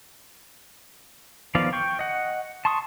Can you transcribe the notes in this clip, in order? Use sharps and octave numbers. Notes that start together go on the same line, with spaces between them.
D#3 F3 B3 D5 F5
G5 C#6
D#5 F#5
A5 C6 C#6 D#6